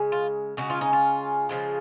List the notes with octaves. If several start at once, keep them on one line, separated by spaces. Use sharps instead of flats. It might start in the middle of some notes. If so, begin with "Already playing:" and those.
Already playing: C#3 G#3
F4
C#3 G#3 C#4 F#4
F4
D#4
F4
C#3 F3 G#3